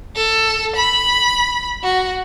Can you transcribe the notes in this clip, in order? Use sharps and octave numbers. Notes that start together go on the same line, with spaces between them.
A4
B5
F#4